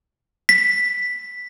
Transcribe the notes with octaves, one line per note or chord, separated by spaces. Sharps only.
B6